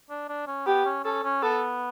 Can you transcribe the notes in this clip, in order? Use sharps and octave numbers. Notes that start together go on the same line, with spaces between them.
D4
D4
C#4
B3 G4
C#4
C#4 A4
C#4
B3 A4